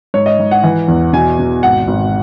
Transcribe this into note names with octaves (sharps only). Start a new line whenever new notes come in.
G#2 C#5
D#5
G#2
F#5
E3
E2
B2 G#5
B2
G#1 F#5
G#1